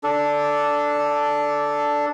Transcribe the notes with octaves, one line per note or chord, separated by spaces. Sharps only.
D4 A4